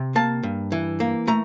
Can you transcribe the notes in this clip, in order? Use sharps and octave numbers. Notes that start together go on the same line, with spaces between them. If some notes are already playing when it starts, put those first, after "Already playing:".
Already playing: C3
A#3 A5
G2
E3
A#3
A3 A#5